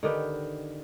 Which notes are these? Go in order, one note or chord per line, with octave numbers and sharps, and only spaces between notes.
D3 D#3 G4 B4